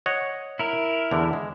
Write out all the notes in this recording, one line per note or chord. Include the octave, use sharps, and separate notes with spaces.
C#5 D#5 F#5
E4 A#4
E2 D3
G#3